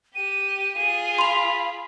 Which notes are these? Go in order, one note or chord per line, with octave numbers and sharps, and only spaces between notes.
G4 D#7
F4 G#4 D#7
B5 C6 F7